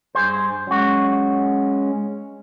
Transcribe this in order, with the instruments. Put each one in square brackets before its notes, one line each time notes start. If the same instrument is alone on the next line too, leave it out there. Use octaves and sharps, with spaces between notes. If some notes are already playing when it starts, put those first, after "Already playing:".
[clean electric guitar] G2 G#4 C5
[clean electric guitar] F#3 F#4 [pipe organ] G#3 C#4